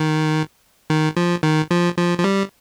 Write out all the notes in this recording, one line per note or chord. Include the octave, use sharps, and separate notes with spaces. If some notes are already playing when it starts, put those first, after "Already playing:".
Already playing: D#3
D#3
F3
D#3
F3
F3
F3
G3